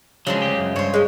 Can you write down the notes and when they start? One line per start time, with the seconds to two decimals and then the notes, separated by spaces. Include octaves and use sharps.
0.27 C#3 F3 F#3 G#3 D4
0.42 D2 G4
0.59 F#2
0.76 G2 C5 C#5
0.94 G#3 C#4